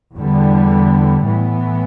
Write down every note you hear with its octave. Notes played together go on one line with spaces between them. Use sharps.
E2 D3 G3 B3
A2 E3 B3